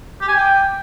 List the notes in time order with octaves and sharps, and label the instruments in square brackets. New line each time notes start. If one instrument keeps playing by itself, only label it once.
[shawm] G4
G#5
G5